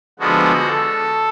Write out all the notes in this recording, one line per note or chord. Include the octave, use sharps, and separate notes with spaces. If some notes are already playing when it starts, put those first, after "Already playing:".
D3 F3 G#3 B3 F#4
A4